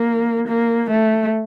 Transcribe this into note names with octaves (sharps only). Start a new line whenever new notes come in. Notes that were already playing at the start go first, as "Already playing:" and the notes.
Already playing: A#3
A#3
A3